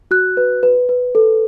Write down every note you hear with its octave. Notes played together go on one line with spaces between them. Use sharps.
F#4 F#6
B4
B4
B4
A4